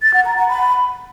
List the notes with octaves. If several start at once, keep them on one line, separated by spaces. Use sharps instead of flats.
A6
F#5
A#5
F#5
B5